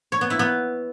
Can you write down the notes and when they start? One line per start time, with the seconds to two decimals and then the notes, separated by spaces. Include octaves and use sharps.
0.12 C#5
0.21 B3
0.30 E4
0.39 B3